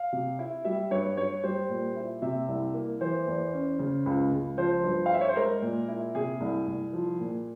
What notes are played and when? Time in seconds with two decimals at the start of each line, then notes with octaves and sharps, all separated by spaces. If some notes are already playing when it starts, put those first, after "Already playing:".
Already playing: F5
0.12 C3
0.39 E4
0.65 G3 E5
0.91 G2 C#5
1.17 G2 C#5
1.43 G3 C5
1.69 A#2
1.96 E4
2.22 C3 E5
2.48 C2
2.74 A#3
3.01 E3 C5
3.27 E2
3.53 C#4
3.79 C#3
4.06 C#2
4.32 C#2
4.57 F3 C5
4.84 G2
5.06 F5
5.10 E4 E5
5.21 C#5
5.29 C5
5.36 G#3 A#4
5.62 A#2
5.88 E4
6.15 C3 G#4
6.41 C2
6.67 C2
6.93 F3
7.19 A#2